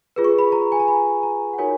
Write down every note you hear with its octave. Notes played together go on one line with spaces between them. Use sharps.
F4 G#4 B4
C#6
B5
A#5
G#5
A#5
B5
A#5
F#5
D#4 F#4 A#4 C#5 G#5